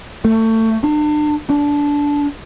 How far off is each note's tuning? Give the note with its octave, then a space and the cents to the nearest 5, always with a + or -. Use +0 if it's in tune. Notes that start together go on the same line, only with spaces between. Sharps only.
A3 +25
D4 +40
D4 -15